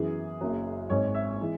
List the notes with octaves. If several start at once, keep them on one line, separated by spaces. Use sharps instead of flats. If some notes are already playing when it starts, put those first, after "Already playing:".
Already playing: F#2 E3 B3 G#4
F#1 F#2 F#3
G#1 G#2 G#3 C#5
E5
E3 G#3